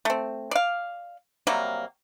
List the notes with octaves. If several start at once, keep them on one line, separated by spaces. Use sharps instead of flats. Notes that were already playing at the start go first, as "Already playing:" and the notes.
A3 C4
D5 F5
C3 F#3 G3 A#3